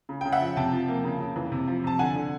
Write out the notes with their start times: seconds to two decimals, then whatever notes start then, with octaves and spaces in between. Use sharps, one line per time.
0.09 C#3
0.21 C#3 G5
0.32 E5 F#5
0.40 F3
0.57 C3 G5 A5
0.72 F3
0.88 A#3
1.04 C#3
1.20 C#3
1.36 E3
1.52 C3
1.68 F3
1.84 C3 A5
1.99 D3 F#5 G#5
2.15 D3